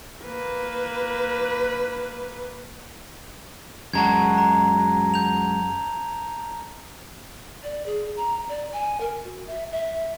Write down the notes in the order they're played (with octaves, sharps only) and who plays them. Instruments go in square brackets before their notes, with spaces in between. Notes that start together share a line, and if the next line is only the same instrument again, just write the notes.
[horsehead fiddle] A#3 B4
[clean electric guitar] F#2 G#3 F#4 [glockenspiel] A5 A#5 G#6
[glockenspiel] A#5
G6 F7
[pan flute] D5
G#4
A#5
D5
G#5
A#4
F#4
E5
E5